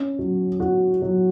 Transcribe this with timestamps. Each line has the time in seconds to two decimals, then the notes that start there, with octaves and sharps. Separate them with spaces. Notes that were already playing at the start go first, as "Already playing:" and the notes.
Already playing: C#4
0.19 F#3
0.60 F#4
1.02 F#3